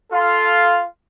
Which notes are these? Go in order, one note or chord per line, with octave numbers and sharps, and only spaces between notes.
F4 A4 F5 C6